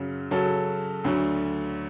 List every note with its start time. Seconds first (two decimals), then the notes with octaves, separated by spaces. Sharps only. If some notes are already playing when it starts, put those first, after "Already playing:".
Already playing: F#2 C#3 F#3
0.31 C#3 F#3 C#4 F#4 A4
1.04 D2 D3 F#3